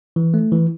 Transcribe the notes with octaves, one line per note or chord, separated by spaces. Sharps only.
E3
A3
E3